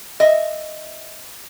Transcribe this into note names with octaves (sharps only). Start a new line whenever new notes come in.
D#5 E5